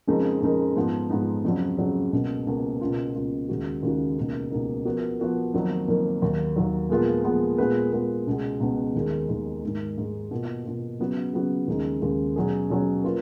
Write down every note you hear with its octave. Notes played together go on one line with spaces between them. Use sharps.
F2 C#3 G#3 D#4 A#4
F2 C#3 G#3 D#4 A#4
G#2 F3 B3 D#4
G#2 F3 B3 D#4
F2 C#3 F#3
F2 C#3 F#3
C#2 B2 A#3
C#2 B2 A#3
C#2 B2 A#3 F4
C#2 B2 A#3 F4
D#2 C#3 G#3 D#4 F#4
D#2 C#3 G#3 D#4 F#4
C#2 B2 A#3 D#4
C#2 B2 A#3 D#4
F3 B3 F#4 A#4
F3 B3 F#4 A#4
F2 D#3 F#3 A#3
F2 D#3 F#3 A#3
D#2 D#3 F#3
D#2 D#3 F#3
A#2 F3 G#3 B3 F4
A#2 F3 G#3 B3 F4
A#2 G#3 B3 F4 B4
A#2 G#3 B3 F4 B4
C#2 B2 G#3 B3
C#2 B2 G#3 B3
D#2 D#3 G#3
D#2 D#3 G#3
G#2 D#3 G#3
G#2 D#3 G#3
B2 A#3 F4
B2 A#3 F4
C#3 F#3 B3 F#4
C#3 F#3 B3 F#4
D#2 C#3 G#3 D#4
D#2 C#3 G#3 D#4
B2 F#3 C#4 G#4
B2 F#3 C#4 G#4
A#3 F4 B4